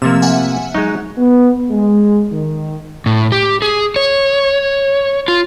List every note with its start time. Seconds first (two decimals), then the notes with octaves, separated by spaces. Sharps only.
0.02 C3 F3 A3 A#3 E6
0.22 E5 F#5 G#5
0.74 F#3 G#3 D#4
1.18 B3
1.71 G#3
2.32 D#3
3.06 A2
3.32 G4
3.62 G#4
3.96 C#5
5.28 F4